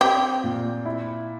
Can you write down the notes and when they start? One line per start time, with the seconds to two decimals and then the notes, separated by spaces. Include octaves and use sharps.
0.01 C4 G4
0.44 A#2
0.86 E4